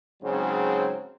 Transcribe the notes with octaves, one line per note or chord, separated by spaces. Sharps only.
G#2 C#3 F#3 C4